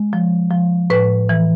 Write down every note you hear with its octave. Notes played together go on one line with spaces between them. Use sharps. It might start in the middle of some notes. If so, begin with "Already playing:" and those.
Already playing: G#3
F3
F3
A2 B4
E3